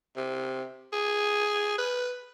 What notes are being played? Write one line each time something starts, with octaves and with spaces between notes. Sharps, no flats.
C3
G#4
B4